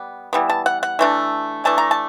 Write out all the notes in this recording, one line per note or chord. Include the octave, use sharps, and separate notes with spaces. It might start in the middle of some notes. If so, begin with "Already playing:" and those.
Already playing: G3 B3
E3 G3 B3
A5
F#5
F#5
E3 A3 D4
E3 A3 D4 A5
A#5
A5